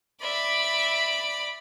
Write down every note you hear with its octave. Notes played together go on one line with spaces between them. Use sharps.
D5 E5 B5